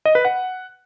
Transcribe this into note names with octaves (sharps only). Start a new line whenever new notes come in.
D#5
B4
F#5